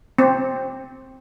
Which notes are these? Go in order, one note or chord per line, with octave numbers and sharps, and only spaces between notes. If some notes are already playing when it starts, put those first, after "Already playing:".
C4